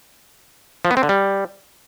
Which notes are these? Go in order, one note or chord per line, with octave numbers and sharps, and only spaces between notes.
F3
B3
C4
D3
G3